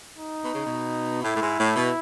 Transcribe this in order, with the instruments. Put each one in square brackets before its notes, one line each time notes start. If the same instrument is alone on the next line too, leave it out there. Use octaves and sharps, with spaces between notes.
[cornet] D#4
[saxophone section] B2
C#3
B2
[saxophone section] A2 [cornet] E4
[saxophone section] A2
G#2
A2
B2